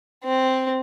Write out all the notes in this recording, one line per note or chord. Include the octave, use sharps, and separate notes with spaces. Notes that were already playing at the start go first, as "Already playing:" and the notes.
C4